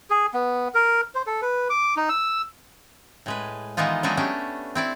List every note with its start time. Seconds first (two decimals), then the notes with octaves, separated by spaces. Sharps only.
0.10 G#4
0.34 B3
0.75 A#4
1.15 C5
1.27 A4
1.42 B4
1.70 D6
1.96 D#4
2.09 E6
3.26 A2 G#3 B4
3.77 D#3 E3 G#3 B3 D#4 F4
4.03 F#3 G#3 B3 D4 D#4
4.17 A3 C#4 D4 G4
4.75 C4 E4 D5